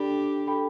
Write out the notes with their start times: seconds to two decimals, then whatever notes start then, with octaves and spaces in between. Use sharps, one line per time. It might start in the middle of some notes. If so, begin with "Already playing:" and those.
Already playing: D4 G4 A4 G5 B5
0.47 A4 G5 B5